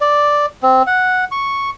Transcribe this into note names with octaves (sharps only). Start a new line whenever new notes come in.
D5
C4
F#5
C#6